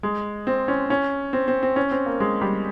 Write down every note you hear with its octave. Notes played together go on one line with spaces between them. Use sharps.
G#3
C4
C#4
C#4
C4
C4
C4
C#4
C4
A#3
G#3
G3